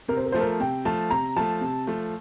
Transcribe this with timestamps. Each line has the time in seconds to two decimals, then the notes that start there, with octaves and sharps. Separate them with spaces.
0.08 C3 A#4
0.17 C5
0.26 A#4
0.32 F3 A3 C5
0.41 A#4
0.60 C3 G5
0.85 F3 A3 A5
1.10 C3 A#5
1.36 F3 A3 A5
1.61 C3
1.87 F3 A3